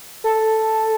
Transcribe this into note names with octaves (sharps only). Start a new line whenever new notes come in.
A4